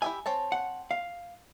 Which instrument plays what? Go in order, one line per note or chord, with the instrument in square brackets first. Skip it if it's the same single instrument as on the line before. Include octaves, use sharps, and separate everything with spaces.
[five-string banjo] E4 G4 E5 [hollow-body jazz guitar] G#5
[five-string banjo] C4 C#5 A5
[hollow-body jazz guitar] F#5
F5